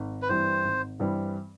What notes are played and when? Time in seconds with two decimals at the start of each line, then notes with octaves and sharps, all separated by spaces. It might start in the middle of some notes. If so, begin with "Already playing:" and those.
Already playing: G#1
0.22 B4
0.29 G2 E3 G3 C4 C5
0.64 G#1
1.00 G2 E3 G3 C4